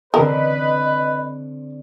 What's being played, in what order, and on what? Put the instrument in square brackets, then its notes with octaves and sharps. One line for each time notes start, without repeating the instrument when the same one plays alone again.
[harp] D3 C4 D5 [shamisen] A#4 [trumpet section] B4 [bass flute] D#5